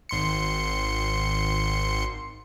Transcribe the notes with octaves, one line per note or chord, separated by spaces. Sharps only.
G#1 C6 C#7